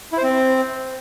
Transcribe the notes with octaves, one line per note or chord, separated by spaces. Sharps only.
E4
C5
C4